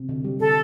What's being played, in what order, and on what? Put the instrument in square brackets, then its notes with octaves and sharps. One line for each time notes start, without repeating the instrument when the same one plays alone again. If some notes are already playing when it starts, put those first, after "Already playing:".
Already playing: [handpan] C3
D3
G3
[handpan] D3 [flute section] A4